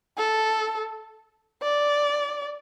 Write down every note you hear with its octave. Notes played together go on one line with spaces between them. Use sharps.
A4
D5